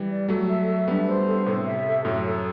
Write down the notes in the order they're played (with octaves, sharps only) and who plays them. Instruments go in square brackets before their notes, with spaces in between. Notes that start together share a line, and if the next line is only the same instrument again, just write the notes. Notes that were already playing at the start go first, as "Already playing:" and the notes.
Already playing: [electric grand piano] E3 G3
[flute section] D5
[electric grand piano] F#3 A3 [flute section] A4
[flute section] E5
A4
[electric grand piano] G3 B3 [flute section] D4
[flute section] C5
A4
[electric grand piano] A2 C3 [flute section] A4
[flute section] E5
A4
[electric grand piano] F#2 A2 [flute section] A4
[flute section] A4